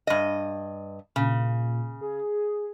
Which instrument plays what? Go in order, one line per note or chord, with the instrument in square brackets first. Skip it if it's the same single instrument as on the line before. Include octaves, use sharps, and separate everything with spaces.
[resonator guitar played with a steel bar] G2 D#5
[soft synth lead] A#2 [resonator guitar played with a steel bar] C#3
[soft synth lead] G#4